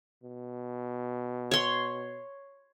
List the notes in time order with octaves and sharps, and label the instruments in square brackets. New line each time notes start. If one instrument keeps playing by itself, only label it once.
[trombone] B2
[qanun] C#5 C6